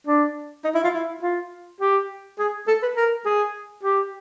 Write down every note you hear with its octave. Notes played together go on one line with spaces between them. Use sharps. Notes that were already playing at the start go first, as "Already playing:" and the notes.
D4
D#4
E4
F4
E4
F4
G4
G#4
A4
B4
A#4
G#4
G4